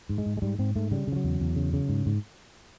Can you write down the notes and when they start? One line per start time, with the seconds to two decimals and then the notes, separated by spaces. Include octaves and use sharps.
0.09 G#2
0.18 G#3
0.26 G#2
0.37 G#3
0.42 G#2 G3
0.59 G#2 C4
0.76 G#2 A3
0.91 C#3 G3
1.07 C#3 F3
1.16 F#3
1.24 E2
1.40 E2
1.56 C#3
1.73 C#3
1.89 G#2
2.06 G#2